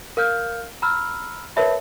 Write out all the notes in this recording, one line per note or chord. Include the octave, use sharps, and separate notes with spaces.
A#4 F5 F6 G6
A#5 B5 E6 F6
A#4 B4 C#5 E5 A5 B5